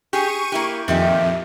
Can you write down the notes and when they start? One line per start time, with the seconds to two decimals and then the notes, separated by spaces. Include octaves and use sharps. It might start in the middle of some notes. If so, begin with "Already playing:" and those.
0.13 G4 G#4 C#6 D#7
0.52 A#3 E4 G4
0.88 F2 A#2 D#3 G4 E5